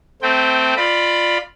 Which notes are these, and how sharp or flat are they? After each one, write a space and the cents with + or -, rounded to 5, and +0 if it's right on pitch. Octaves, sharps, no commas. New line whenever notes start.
A3 +0 C4 -15 G5 +0
F4 +0 D5 +25 B5 +0